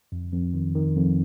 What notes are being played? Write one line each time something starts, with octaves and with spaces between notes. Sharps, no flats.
F2
F2
D#3
D#3
F2